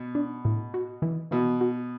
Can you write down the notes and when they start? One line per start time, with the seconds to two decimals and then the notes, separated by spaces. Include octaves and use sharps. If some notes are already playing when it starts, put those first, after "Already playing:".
Already playing: B2
0.15 D4
0.45 A2
0.74 F#4
1.02 E3
1.31 B2 E3
1.61 F#4